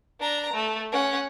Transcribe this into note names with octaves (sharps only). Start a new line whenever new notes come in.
D4 A#5
A3
C#4 F#5